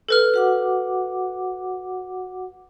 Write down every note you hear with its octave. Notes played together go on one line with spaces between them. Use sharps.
A4 B4 F6
F#4 F#5 D6